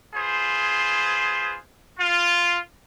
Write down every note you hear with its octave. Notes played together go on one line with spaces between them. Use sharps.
F4 G#4 B4 C5
F4